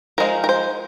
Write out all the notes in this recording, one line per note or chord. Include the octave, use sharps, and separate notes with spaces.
F3 G#3 D#4 A#4
A#4
C5